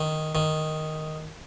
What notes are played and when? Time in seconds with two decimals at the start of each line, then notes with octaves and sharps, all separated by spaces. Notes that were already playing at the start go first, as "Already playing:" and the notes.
Already playing: D#3
0.35 D#3